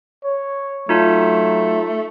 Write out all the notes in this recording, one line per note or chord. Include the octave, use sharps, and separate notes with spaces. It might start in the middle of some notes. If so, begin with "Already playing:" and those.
C#5
F#3 A3 D#4 F4 A5